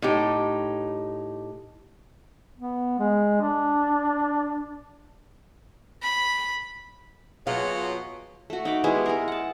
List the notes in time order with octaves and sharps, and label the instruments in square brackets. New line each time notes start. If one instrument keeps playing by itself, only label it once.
[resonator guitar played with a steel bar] A2 D#4 G4
[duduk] B3
G#3
D4
[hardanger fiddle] B5
[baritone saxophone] B2 [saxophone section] F#3 G#4 C#5 [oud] F4
[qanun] A3 F#4
D#4 B5 D6
G3 G#3 B3 E4
G#3 A#4
F#5 A5